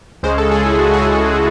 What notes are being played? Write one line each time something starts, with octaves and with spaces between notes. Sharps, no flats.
C#2 C#3 G#3 C5
A4
G#4
E4
F#4
G#4
G#4
A4